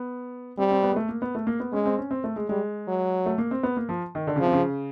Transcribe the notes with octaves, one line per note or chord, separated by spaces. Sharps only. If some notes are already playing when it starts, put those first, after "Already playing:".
Already playing: B3
G3 C4
C4
B3
G#3
A3
A#3
B3
A3
A#3
B3
G#3 C#4
C4
C#4
C4
A3
G#3
G3 G#3
F#3
A3
A#3
C4
B3
A#3
F3
D#3
D3
C#3
C3 F3
C#3